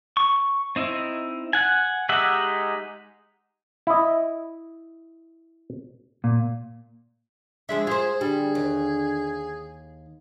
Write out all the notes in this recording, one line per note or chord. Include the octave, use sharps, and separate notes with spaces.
C#6
C4 D#4 E4
F#5 G#5
G#3 D#4 G4 E5 F#5
E4 D#5
A#2
F3 G#3 D4 E5
F4 G#4 C5
D3 G3
D#2